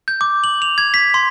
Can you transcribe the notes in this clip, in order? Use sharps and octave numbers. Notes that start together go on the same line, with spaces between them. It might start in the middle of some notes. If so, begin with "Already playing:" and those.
G6
D6
F#7
F7
G#6
B6
C6